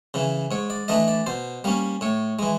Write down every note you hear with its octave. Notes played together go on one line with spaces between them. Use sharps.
C#3 E3
G#2 C#5
D5
E3 A3 D4 D#5
D5
B2 C5
G3 A#3 C#4
A2 C#5
E3 G#3